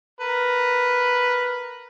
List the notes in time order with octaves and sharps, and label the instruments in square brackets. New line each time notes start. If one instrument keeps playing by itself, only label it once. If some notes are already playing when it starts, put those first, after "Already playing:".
[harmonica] A#4 B4